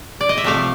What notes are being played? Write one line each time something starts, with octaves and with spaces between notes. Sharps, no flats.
D5
D#5
E5
C3 F3 A3 F5